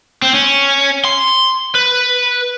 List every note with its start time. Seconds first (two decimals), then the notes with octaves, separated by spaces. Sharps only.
0.22 C4
0.34 C#4
1.05 C6
1.75 B4